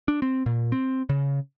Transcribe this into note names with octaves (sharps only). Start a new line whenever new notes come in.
D4
C4
A#2
C4
C#3